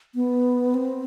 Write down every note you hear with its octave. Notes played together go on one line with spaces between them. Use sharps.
B3
C4